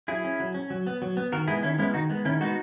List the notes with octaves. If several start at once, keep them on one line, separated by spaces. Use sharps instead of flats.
F#3 E4 G#4
C#4
F#3
C#4
F#3
B3
F#3
B3
D#3 F#4 A#4
G#3 B3 E4 G#4
D#3 C#4 E4
G#3 B3 C#4 E4
D#3 D#4 F#4
G#3 B3
D#3 C#4 E4
G#3 B3 D#4 F#4